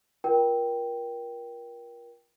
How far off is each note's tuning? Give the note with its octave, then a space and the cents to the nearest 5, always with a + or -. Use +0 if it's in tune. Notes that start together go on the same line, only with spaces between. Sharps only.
F4 +0 A#4 +30 G5 +0